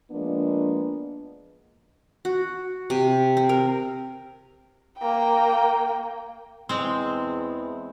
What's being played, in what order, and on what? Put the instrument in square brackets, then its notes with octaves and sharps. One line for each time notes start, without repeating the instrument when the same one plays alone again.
[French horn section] F3 G#3 A#3 B3 D4
[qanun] F#4
C3
C4
A#4
[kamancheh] A#3 G5
[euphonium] E2 [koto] G#3 C4